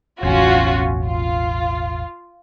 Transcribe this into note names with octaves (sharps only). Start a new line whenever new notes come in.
E1 A1 C#4 F4 F#4
F4